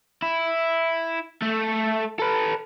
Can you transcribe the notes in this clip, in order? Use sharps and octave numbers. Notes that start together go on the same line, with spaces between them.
E4
A3 A4
A4 B4